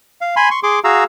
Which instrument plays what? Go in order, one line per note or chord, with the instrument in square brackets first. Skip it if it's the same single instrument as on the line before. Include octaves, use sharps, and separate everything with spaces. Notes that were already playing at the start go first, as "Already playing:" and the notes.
[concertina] F5
G#5 B5 C6
C6 C#6
G#4 C6 D6
F#4 G#4 F5 A#5 E6